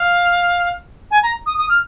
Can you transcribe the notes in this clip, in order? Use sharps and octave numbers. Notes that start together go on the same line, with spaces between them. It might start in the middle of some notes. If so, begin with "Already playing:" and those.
Already playing: F5
G#5
A#5
D#6
D#6
F6